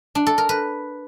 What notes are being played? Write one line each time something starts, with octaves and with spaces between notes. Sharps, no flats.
D4
A4
A#4
B4